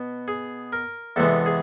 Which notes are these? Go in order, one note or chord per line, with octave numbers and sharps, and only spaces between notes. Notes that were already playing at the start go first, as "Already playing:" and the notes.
Already playing: B2 B3
G#4
A#4
E2 C3 E3 G#3 B3 A4
G#4